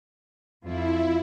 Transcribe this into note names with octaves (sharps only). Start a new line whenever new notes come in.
F2 E4 F4